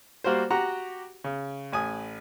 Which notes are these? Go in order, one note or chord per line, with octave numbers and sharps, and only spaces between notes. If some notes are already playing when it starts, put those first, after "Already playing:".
G3 A#3 F#4 A#4 C5
F#4 G4 F#5 A#5
C#3
A1 G#5 D#6